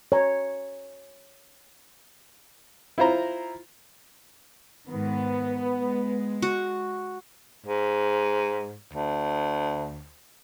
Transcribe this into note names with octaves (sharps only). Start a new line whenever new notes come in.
C#5 A#5
E4 F4 C5 A#5
G#2 D#3 B3
G#3
F#4
G#2
D2